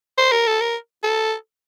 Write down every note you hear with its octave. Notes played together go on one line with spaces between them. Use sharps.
C5
A#4
A4
A#4
A4